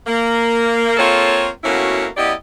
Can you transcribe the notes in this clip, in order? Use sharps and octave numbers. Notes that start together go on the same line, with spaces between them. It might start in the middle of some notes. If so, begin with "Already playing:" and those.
A#3
A#3 C4 F4 A4 C#5
B2 A3 A#3 C#4 E4 F#4
F#2 B3 E4 G4 D5 D#5